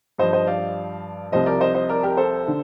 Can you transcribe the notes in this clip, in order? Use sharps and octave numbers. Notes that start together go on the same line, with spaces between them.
G2 F3 C5 D#5
C5 D#5
D5 F5
C2 C3 F3 C5 D#5
A#4 D5
C5 D#5
C5 D#5
A#4 D5
G4 A#4
A4 C5
D3